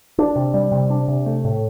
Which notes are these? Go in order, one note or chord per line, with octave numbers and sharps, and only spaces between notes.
D4
C3
G3
C3
D4
C3
A3
A2